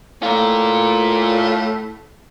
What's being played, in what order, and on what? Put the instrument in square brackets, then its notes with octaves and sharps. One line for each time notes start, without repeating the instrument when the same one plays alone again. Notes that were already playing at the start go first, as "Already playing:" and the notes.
[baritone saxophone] A2 [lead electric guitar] F4 A#4